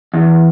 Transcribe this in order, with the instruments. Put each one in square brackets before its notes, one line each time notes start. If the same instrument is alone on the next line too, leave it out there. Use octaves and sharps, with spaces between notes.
[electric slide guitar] E2